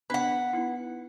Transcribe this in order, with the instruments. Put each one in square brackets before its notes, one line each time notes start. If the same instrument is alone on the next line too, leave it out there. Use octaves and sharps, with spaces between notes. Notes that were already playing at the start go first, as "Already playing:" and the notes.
[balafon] B3 D4 [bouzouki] B4 F#5
[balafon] B3 D#4 E4